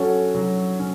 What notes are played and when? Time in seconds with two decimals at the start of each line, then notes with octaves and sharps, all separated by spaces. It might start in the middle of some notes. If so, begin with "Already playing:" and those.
Already playing: F#3 C#4 F#4 A4
0.35 F#3
0.79 C#4